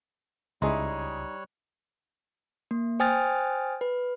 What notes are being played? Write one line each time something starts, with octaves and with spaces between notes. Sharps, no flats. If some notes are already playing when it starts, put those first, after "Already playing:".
C#2 G3 D#4 E4 G#4 C#5 C6 F#6
A#3
C5 G5 G#5 D#6 F6 A6
B4